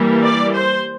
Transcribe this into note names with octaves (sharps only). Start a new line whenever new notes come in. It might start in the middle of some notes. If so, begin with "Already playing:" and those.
Already playing: E3 G3 A#3
D5
C5